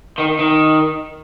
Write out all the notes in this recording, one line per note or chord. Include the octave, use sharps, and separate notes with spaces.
D#3
D#3